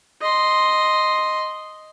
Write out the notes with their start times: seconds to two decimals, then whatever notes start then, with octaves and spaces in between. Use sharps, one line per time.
0.22 D#5 C6